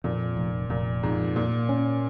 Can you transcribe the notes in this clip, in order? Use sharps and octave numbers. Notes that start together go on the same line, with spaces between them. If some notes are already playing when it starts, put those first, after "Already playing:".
F2 A#2
F1
F1 A#2
F2 G#2
A#2 A#3
C#4